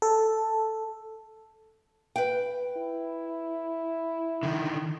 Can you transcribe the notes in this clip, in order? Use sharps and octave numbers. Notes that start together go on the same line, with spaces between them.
A4
B4 G5
E4
D3 D#3